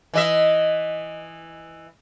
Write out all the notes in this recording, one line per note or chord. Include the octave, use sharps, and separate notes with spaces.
E3 D#5 E5